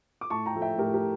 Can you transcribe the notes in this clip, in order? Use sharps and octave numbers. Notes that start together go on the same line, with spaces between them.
D6
A2 A5 C#6
G5 A#5
F3 A3
E5 G5
A2 G4 A#4
G4 A#4